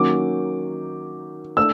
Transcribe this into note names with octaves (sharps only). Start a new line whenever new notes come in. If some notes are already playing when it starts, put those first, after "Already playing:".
Already playing: D#3 F#3 A#3 C#4 D6
A3 D4 E6